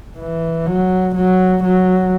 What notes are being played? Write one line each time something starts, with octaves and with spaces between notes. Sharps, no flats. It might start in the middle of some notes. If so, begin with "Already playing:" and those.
E3
F#3
F#3
F#3